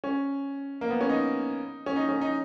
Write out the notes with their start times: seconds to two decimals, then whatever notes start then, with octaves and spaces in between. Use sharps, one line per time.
0.04 C#4
0.81 A#3
0.90 B3
1.01 C#4
1.10 D#4
1.86 C#4
1.96 D#4
2.09 C#4
2.22 D#4